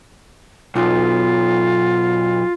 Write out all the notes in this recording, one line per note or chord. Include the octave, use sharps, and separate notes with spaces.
B1 F4